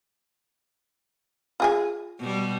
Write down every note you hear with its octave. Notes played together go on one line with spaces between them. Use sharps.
F4 G#4 G#5
B2 G3